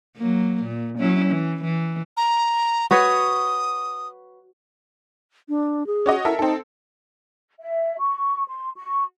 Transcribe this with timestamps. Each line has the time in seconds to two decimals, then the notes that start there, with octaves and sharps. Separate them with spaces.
0.16 F#3 A#3
0.64 A#2
0.99 F#3 C#4 E4
1.31 E3
1.64 E3
2.17 A#5
2.91 F#4 B4 C#5 D#6
5.49 D4
5.87 G#4
6.06 C#4 F#4 D#5
6.25 E4 A4 A#4 E5
6.39 C4 D#4 A4
7.60 E5
7.99 C#6
8.48 C6
8.75 C#6